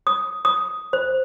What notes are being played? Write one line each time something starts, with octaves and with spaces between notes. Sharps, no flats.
D#6
D#6
C5